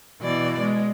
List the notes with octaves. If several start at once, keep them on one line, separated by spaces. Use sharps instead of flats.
B2 E3 D5
G#3